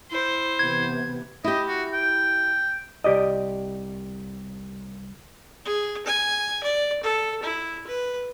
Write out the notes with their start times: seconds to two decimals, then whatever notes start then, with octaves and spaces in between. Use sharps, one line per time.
0.11 E4 C5
0.59 C3 E3 B3 G#6
1.44 E4 G4 D#5
1.68 F#4
1.93 G5
3.04 C2 G4 D5 D#5
5.65 G#4
6.06 G#5
6.63 D5
7.03 A4
7.43 E4
7.87 B4